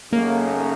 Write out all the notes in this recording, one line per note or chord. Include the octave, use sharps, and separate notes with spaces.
F#2 C#3 F#3 A3 A#3 D#4